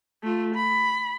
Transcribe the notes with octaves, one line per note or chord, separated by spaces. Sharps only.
A3 F4
B5